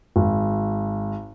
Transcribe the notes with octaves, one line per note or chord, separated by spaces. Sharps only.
G#1